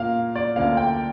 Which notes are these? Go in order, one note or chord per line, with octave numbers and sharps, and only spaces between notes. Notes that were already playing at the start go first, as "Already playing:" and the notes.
Already playing: A#2 A#3 F4 F5
D5
D2 D3 A#3 F4 F5
G5